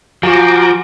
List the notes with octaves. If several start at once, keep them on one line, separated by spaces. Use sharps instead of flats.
F3 F#4 G#5 A#5 C#6 D6